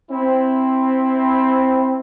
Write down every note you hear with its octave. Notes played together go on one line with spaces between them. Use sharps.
C4 E4